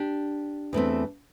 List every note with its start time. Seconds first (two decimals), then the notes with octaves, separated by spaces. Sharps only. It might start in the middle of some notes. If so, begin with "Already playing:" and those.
Already playing: D4 G4
0.73 E2 E3 A3 C4